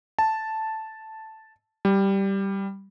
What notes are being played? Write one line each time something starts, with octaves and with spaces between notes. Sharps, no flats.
A5
G3